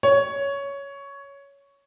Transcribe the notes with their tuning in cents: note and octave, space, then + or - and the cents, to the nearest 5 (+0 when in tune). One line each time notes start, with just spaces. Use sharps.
C#5 +10